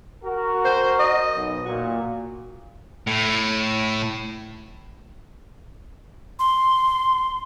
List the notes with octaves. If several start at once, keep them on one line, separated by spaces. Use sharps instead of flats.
F#4 A#4
C5
D#5
B1
A#2 F#4
A2
C6